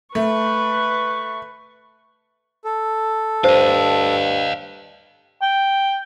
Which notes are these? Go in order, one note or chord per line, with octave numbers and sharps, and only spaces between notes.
A3 B4 C#6
A4
G2 C5 D#5 F5
G5